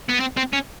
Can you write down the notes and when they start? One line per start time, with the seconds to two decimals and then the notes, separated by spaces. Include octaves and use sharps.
0.09 B3
0.20 C4
0.37 C4
0.53 C#4